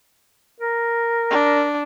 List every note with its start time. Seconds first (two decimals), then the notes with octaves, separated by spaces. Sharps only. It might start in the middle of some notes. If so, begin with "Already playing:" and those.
0.61 A#4
1.30 D4